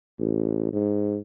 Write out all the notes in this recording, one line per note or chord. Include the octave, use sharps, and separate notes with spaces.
A1
G#2